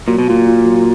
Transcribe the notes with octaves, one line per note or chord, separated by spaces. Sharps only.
A#2 F#3
B2
A#2 F4
F4
F#3